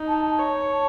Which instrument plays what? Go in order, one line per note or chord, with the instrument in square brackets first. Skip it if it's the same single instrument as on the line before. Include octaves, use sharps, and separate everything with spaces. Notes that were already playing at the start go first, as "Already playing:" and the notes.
Already playing: [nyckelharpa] D#4
[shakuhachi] A5
[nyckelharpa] C#5
[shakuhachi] A5